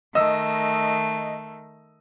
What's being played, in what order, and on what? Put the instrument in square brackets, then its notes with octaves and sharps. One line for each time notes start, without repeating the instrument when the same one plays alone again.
[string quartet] D#3 A3 [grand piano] D#5 E6